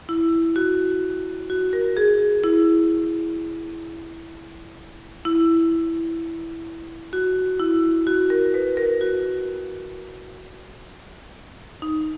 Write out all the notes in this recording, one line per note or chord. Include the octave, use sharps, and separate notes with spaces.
E4
F#4
F#4
A#4
G#4
E4
E4
F#4
E4
F#4
A#4
B4
A#4
F#4
D#4